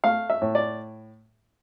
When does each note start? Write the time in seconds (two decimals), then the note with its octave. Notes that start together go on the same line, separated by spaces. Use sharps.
0.04 A3 F5
0.30 E5
0.42 A2
0.55 D5